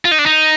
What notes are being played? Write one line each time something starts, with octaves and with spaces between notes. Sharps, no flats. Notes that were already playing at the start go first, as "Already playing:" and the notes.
F4
D#4
D4
D#4